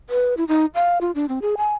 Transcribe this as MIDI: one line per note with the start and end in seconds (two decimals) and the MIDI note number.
0.10 0.34 71
0.37 0.44 64
0.48 0.66 63
0.75 0.98 77
1.01 1.11 65
1.15 1.26 62
1.29 1.39 60
1.42 1.55 68
1.57 1.73 80